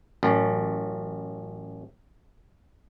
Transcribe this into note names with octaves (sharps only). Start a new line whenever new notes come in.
A1 F#2